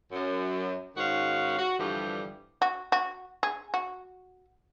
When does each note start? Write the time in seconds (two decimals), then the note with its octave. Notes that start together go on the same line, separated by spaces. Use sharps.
0.12 F#2
0.96 G#2 D#3 C#4 F#4 F5
1.59 F#4
1.78 G2 D3 E3 F3 G3
2.62 F#4
2.92 F#4
3.43 G#4
3.74 F#4